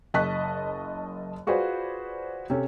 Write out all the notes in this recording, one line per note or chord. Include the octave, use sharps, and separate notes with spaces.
F#1 D#5 A5 C#6 F#6 B6
F4 F#4 G#4 B4 C5 D5
C3 C#4 A4